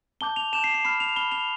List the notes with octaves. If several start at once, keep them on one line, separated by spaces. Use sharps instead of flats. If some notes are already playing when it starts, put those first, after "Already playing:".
A5 D6 G6 G7
F7
A5 D6 G6 E7
C7
C7
B5 F6 C7
F7
B5 F6 G7
F7